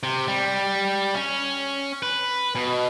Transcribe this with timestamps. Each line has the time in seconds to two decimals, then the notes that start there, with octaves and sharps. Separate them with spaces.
0.03 C3
0.28 G3
1.15 C#4
2.03 B4
2.55 B2